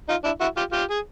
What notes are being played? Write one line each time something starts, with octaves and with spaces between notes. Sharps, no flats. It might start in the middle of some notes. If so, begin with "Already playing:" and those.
D#4 F4
D4 E4
E4 F#4
F4 G4
F4 G4
G#4